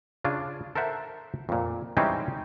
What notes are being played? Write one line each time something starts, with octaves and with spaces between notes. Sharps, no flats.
C#3 D4 F4 G#5
A4 A#4 C5 E5 F#5
F2 A#2
E3 G3 G#3 C4 C#4 D#4